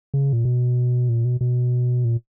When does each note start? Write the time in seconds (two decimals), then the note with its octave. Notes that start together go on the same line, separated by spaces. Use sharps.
0.14 C#3
0.33 A#2
0.45 B2
1.09 A#2
1.25 B2
1.41 B2
2.04 A#2